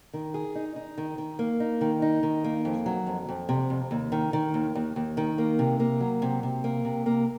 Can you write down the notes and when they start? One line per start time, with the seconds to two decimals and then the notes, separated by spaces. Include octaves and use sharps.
0.14 D#3
0.34 G#4
0.55 D#4
0.76 D#4
0.98 D#3
1.18 D#3
1.39 A#3
1.60 D#4
1.81 D#3
2.02 D#4
2.23 D#3
2.44 A#3
2.65 F2
2.86 F#3
3.07 F2
3.29 F2
3.49 C3
3.70 F2
3.91 D#2
4.12 D#3
4.33 D#3
4.54 D#2
4.75 D#2
4.96 D#2
5.17 D#3
5.38 A#3
5.59 C3
5.80 A#3
6.00 F#3
6.22 C3
6.43 C3
6.64 A#3
6.85 C3
7.06 A#3